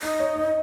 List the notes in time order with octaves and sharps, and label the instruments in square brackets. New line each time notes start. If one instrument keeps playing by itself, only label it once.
[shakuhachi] D#4 [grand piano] D#5
[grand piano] C#5
D#5